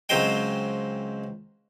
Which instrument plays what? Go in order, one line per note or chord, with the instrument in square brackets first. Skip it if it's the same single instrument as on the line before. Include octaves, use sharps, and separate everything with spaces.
[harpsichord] C#2 F#3 C4 C5 D#5 G5